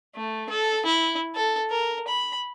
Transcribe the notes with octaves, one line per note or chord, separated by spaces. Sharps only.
A3
A4
E4
A4
A#4
B5